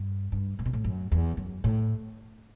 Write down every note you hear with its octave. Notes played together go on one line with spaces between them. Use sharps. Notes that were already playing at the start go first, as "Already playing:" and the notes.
Already playing: G2
G2
A2
B2
A2
F#2
E2
F#2
A2